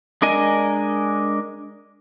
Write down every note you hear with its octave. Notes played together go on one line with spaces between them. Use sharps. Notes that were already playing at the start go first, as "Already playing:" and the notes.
G#3 D4 A#4 D#5 G#5